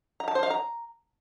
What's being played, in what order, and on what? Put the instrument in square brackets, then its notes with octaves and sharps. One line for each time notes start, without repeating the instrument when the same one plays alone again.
[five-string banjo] A#5
A5
C5
F5
A#5